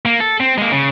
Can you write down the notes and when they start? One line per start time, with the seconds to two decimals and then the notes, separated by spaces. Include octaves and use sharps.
0.05 A#3
0.20 A4
0.40 C4
0.58 G#3 A#3
0.71 C#3